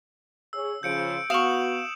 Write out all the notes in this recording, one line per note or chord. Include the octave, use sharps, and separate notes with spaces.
G#4 C#5 E6
C#3 F3 G6 C#7 D7
B3 F#4 F5 C#6 D#6 E7 F#7